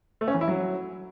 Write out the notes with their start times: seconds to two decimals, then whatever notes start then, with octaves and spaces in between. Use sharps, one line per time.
0.21 A3
0.28 C#4
0.34 E3
0.41 E4
0.48 F#3